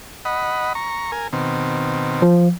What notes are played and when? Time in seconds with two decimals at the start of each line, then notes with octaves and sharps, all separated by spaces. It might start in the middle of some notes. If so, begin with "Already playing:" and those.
0.25 D#5 F#5 B5
0.75 A#5 C#6
1.12 A#4 G#5
1.33 B2 D#3 C4
2.22 F3